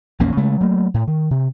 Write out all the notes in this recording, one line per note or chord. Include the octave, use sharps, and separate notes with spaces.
A#1 E2 A#3 C#4
C#3 G#3 A3
F#3 A3 A#3
A2
D#3
C3